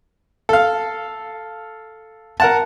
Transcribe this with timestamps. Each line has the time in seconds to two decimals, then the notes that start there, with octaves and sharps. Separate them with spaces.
0.49 A4 F5
2.40 A#4 F#5 A5